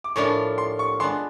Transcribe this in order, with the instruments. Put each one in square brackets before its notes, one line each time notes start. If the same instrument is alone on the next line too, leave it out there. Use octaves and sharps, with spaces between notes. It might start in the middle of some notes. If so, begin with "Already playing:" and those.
[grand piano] D6
[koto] A2 F3 A#3 D4 F4 [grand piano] C#6
[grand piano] C6
C#6
[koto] G#3 B3 D4 [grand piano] C6